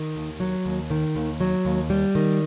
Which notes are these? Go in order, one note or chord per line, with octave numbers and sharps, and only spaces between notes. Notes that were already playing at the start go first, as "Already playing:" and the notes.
Already playing: D#3
D#2
F#3
D#2
D#3
D#2
F#3
D#2
G3
D#3